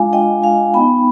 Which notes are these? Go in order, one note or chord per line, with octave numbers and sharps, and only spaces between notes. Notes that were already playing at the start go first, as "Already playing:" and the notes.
Already playing: G#3 D4 F4 F5 G#5
D#5 G5
F5 G#5
B3 D#4 G5 B5